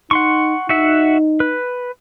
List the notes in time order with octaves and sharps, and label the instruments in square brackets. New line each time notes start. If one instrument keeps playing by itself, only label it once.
[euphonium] D#4 [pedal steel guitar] F#5 C6 C#6
[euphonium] D#4 [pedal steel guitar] F#4 E5 F#5
[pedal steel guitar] B4